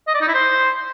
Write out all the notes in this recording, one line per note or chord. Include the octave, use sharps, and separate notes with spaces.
D#5
D5
D#4
E4
C5